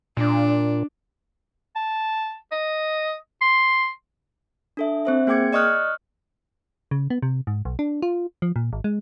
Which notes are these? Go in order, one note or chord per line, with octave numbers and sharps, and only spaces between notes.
A#2 D4
A5
D#5
C6
D4 A4 E5
C4 C5 E5
A#3 G#4 G5 D6 G#6 C#7
D5 D#5 C#6 D#6 F6 F#6
C#3
B3
C3
G#2
B1
D4
F4
F3
A#2
G#1
G#3